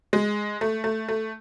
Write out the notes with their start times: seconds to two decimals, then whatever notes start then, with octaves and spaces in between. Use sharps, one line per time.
0.13 G#3
0.61 A3
0.84 A3
1.09 A3